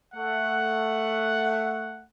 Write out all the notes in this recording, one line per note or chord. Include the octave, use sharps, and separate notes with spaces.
A3 F#5